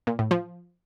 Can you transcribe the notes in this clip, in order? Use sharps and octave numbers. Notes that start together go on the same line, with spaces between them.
A#2
A2
F3